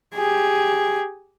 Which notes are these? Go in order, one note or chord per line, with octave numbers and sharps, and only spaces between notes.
G4 G#4